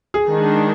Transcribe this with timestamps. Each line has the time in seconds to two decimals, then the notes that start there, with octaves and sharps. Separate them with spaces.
0.14 G#4
0.28 D#3 G#3 D4